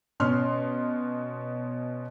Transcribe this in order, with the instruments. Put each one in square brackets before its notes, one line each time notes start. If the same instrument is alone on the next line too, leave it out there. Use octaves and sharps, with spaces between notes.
[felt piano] B2 C#4 C6 F6